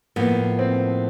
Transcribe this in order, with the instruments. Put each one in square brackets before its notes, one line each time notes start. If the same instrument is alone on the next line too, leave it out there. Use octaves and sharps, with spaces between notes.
[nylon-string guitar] A2 F3 A#3 [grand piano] B3
[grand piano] C4